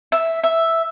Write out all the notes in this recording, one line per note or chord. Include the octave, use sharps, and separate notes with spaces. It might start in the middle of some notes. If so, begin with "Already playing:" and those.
E5
E5